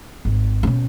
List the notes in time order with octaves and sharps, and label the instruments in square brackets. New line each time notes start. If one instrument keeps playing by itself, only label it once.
[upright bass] G#1
B2 C#4